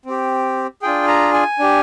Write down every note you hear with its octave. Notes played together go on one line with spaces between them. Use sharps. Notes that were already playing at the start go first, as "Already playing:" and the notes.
C4 G4
D4 F4 G#4 G5
A#5
G#5
D4 G4